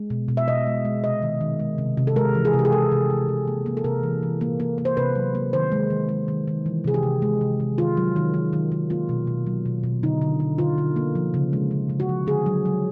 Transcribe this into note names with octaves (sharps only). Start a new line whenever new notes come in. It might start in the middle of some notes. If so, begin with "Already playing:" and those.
Already playing: G#3
B2
B2
E5
B2 D#5
G#3
G#3
C3 D#5
D#3
D#3
G#3
C3
C3
A4
G#3 A#4
E3
G#4
C3
G4
G#4
G#3 A4
C3
C3
C3
A#3
A#3
A4
C3 A#4
E3
E3
A#3
A#3
A#3
C5
C3 B4
F#3
A#3
D#3 C5
G#3
D#3
G#3
D#3
D#3
E3
C3 G#4
G4
C3
G#3
C3
C3
D#3 F4
F#3
D#3
D#3
D#3
D#3
A#3 F4
B2
B2
F#3
B2
B2
D3 D#4
D3
D3
D3 F4
D3
A#3
F3
C#3
G#3
C#3
C#3
F#4
F3
D3 G#4
F#3
F#3